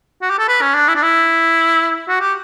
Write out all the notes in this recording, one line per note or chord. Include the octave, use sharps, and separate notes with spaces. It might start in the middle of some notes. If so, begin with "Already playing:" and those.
F#4
G4
A4
B4
C#4
D4
E4
D4
E4
F#4
G4